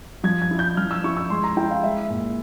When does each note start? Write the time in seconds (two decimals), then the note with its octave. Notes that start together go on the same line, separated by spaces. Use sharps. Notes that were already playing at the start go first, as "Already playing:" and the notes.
0.24 F3 G#6
0.42 G#6
0.51 E4
0.59 G6
0.77 F3 F6
0.91 E6
1.04 E4 C#6
1.17 E6
1.30 G#3 C6
1.44 A#5
1.57 E4 G5
1.71 F5
1.83 G#3 E5
2.10 A#2